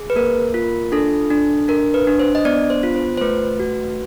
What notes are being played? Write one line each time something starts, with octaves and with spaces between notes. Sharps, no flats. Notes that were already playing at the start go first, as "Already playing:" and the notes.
Already playing: G#4
B4
A#3 A#4
F4
D4 A4
D4
D4 A#4
B4
D4
C5
D#5
B3 D5
C5
F4
C5
C5
A3 B4
F#4